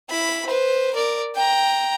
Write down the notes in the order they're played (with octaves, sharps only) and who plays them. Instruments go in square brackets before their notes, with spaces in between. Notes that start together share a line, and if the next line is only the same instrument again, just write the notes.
[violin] E4 B5
B4 C5
A#4 D5
G5 A#5